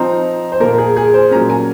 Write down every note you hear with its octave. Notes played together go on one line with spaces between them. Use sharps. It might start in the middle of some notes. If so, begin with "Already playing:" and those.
Already playing: F3 C4 D#4 A#5
C5
A#2 F3 A#3 A#4
G#4
G#4
C5
A#2 F#3 A#3 C#4 A#5
G#5